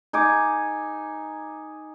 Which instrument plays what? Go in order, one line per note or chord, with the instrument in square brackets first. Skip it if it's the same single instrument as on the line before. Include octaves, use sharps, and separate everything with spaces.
[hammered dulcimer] D#4 G#5 D6